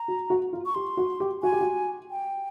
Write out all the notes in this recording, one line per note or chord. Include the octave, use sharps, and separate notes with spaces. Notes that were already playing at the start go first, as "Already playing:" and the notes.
Already playing: A#5
F#4
F#4
F4
C#6
G4 C6
F#4
G4
F#4 G#5
G4
F#4
G5